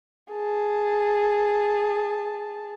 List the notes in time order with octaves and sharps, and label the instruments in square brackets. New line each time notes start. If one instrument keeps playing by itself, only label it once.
[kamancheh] G#4 A5